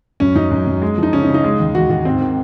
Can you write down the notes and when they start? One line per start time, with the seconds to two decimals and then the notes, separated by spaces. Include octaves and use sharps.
0.20 F#2 C#4
0.36 F#2 D#4
0.51 F#2
0.67 F#2
0.82 G#3
0.98 F3
1.03 D#4
1.13 C#3 C#4
1.23 D#4
1.29 C#3
1.34 D#4
1.44 G#3
1.60 D#2
1.75 D#2 F#4
1.90 D#2 F#4
2.05 G#2 C4
2.21 D#3